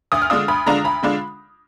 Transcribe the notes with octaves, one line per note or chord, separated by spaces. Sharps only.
D2 D#6
F6
D3 G#3 D4 F4 D#6
D2 B5
D3 G#3 D4 F4 A#5
D2 B5
D3 G#3 D4 F4